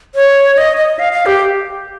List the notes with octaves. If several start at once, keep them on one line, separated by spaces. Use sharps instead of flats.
C#5
D#5
D#5
F5
F5
G4